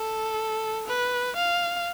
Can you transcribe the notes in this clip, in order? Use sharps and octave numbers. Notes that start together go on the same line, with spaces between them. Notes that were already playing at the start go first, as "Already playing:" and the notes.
Already playing: A4
B4
F5